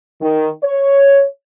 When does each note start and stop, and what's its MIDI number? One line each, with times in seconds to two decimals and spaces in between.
0.22 0.50 51
0.63 1.25 73